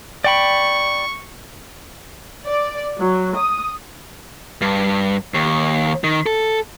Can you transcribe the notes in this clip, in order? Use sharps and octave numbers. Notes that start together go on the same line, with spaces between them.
D5 G5 B5 C#6
D5
F#3
D#6
G2
D#2
D#3
A4